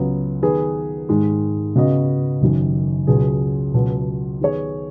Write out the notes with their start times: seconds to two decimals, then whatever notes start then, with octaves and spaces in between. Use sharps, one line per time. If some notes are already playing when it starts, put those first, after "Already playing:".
Already playing: C#2 C#3 F#3 B3
0.42 D#3 B3 G#4 B4
1.09 G#2 D#3 G#3
1.76 C#3 B3 F#4 B4 D#5
2.41 F#1 F#2 D#3
3.07 C#2 B2 F#3 C#4 G#4
3.74 C#2 B2 F#3
4.41 D#3 B3 G#4 C#5